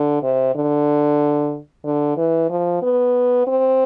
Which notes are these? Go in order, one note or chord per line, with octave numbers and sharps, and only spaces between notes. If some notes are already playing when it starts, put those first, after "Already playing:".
Already playing: D3
C3
D3
D3
E3
F3
B3
C4